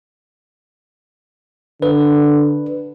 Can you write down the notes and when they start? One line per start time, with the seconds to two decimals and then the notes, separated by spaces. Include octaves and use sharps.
1.82 D3 B4